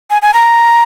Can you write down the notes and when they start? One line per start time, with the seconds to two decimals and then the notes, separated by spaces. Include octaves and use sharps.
0.10 G#5
0.22 G#5
0.34 A#5